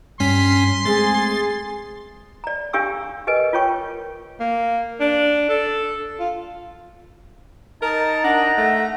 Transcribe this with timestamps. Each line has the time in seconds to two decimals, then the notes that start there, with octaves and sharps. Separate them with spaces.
0.20 G2 C#4 C6 B6
0.85 G#3 A3 C4 G#4 A6
2.44 D5 A#5
2.73 D4 G4 F5 G#5 C#6 E6
3.27 G4 A#4 B4 D#5 G#5
3.53 F4 A#4 C#5 G5 C#6
4.40 A#3
5.00 D4
5.49 A4
6.20 F4
7.82 D#4 A#4 A5
8.24 D4 F#5 A#5
8.58 A3